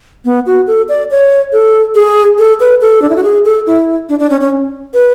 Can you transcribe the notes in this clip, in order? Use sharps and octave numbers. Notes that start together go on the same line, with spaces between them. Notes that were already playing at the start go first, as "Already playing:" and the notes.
B3
F#4
A4
D5
C#5
A4
G#4
A4
B4
A4
D4
E4
F#4
G#4
A4
E4
D4
D4
C#4
C#4
B4